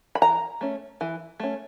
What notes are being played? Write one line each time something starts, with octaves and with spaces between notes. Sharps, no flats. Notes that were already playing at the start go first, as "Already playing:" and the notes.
B5
E3 A#5
A3 C#4
E3
A3 C#4